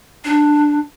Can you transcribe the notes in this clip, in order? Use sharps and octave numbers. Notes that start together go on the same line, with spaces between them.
D4